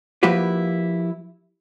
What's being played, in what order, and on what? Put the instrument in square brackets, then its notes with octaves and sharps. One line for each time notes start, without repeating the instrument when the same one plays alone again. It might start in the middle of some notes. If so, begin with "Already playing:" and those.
[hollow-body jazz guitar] F3 A#3 E4 F#4 G4 B4